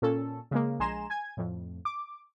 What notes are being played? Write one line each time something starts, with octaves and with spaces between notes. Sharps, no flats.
A#2 C#4 A4
C#3 G#3 A#3
A#1 G#3 G#5 A#5 C6 E7
G#5 G#6
F2 A2
D6